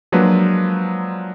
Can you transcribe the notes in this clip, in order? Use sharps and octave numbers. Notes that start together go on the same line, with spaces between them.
F3 F#3 G#3 A#3 D4 B4